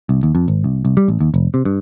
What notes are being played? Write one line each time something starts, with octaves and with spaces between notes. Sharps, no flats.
C2
D#2
F2
G#1
C2
C2
G3
A1
D#2
F1
C3
G2